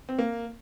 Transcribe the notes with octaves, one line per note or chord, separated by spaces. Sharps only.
C4
A#3